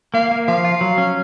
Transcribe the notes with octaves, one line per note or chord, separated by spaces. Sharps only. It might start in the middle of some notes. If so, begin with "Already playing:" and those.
A#3 F5
A#3
F3 F5
F4
F#3
C#4